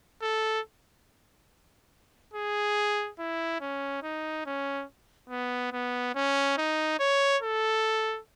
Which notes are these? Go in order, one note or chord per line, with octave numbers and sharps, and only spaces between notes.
A4
G#4
E4
C#4
D#4
C#4
B3
B3
C#4
D#4
C#5
A4